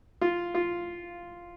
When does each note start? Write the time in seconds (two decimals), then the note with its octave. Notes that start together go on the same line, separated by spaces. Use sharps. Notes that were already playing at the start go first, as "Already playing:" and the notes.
0.21 F4
0.55 F4